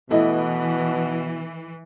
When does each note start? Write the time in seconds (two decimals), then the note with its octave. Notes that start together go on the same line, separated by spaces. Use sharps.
0.10 B2 E3 A3 E4 D#5